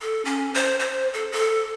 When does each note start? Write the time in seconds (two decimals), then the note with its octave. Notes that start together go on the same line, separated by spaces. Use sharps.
0.01 A4
0.25 C#4
0.54 C5
0.79 C5
1.13 A4
1.32 A4